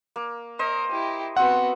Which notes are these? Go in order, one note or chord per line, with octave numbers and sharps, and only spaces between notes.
A#3
A#4 C5 D#5
E4 G4
B3 C4 F#4 F#5